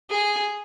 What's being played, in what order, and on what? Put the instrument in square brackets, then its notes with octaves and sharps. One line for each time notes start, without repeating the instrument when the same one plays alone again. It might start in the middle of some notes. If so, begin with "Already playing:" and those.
[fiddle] G#4